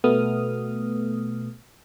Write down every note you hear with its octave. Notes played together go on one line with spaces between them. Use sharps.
B2 A3 B3 D#6 F6